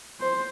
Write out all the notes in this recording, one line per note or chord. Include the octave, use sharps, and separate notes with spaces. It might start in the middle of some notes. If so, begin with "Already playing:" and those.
C5